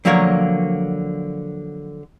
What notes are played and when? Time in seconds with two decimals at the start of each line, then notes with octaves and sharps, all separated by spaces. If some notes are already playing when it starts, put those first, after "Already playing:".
0.05 D3 F3 F#3 A#3 A#4 C#5